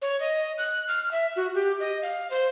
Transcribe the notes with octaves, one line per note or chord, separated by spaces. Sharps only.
C#5
D#5
F#6
F6
E5
F#4
G4
D#5
F5
C5